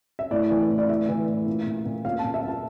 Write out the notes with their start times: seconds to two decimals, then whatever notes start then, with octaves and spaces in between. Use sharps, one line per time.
0.19 E5
0.31 A2 D5
0.51 E3
0.70 A2
0.78 D5
0.89 A2 E5
1.09 E3
1.28 A2
1.46 A#2
1.66 A#2
1.86 A#2
2.05 A#2 F5
2.19 A#2 A5
2.34 E5
2.44 A#2 A5